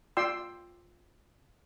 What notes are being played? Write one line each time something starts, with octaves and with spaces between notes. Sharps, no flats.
F4 D5 G5 C6 E6